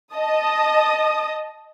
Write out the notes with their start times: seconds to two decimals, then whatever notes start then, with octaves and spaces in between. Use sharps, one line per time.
0.13 D#5 A5 D#6